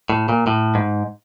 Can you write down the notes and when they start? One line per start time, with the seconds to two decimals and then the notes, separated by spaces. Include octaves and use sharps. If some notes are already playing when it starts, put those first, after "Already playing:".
0.10 A2
0.29 A#2
0.47 A2
0.75 G#2